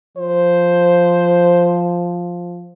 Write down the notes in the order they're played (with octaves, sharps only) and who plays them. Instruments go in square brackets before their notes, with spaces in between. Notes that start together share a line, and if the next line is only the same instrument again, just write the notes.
[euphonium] F3 [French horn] C5